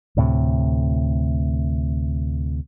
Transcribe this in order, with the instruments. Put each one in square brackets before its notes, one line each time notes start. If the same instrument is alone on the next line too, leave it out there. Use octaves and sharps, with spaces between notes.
[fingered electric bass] D2 A2 C3